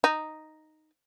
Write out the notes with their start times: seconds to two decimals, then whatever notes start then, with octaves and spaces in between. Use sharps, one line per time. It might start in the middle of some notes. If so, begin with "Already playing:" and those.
0.04 D#4